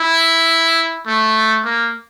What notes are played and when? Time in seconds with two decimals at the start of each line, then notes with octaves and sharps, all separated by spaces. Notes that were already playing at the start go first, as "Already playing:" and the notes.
Already playing: E4
1.06 A3
1.64 A#3